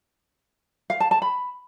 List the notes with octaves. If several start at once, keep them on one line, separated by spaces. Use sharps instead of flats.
F5
A5
A5
B5